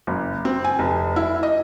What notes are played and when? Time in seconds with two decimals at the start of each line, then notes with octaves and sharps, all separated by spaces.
0.07 F#1
0.45 C4
0.64 G#5
0.79 F1
1.16 E4
1.43 D#5